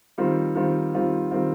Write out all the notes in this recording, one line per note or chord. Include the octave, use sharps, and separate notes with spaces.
D#3 G3 C4 F4
D#3 G3 C4 F4
D#3 G3 C4 F4
D#3 G3 C4 F4